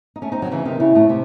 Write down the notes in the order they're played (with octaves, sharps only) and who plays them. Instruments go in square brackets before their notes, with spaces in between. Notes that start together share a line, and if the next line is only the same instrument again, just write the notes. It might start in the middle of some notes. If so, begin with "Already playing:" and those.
[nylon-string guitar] D#4
A3 C#4
C4 D#4
D#3 F#3
C#3 E3
C3 D#3
[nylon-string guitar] C#3 [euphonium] E4
[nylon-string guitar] A2
C3